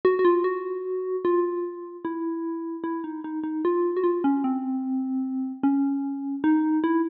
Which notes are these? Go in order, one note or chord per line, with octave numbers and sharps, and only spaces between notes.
F#4
F#4
F4
F#4
F4
E4
E4
D#4
D#4
D#4
F4
F#4
F4
C#4
C4
C#4
D#4
E4